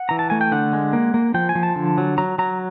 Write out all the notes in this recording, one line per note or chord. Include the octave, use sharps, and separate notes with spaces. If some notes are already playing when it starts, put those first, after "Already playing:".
Already playing: F#5
E3 A#5
A5
A3 G#5
G5
D3 F#5
G#3
A#3
A#3
F3 G5
G#5
F3
A5
D3
F#3
F#3 A#5
F#3 A#5